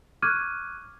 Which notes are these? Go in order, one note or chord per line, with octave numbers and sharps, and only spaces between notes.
C#6 D6 F6 F#6 G#6 D#7